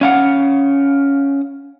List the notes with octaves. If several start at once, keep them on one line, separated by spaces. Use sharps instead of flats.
C#4 F5 F#5